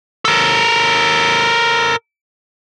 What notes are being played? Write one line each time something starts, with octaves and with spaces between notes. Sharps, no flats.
A4 A#4